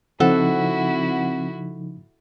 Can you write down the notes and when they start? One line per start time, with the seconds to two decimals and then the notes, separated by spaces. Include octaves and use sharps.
0.20 C#3 F3 C4 D#4 E4 F#4 A4 F#5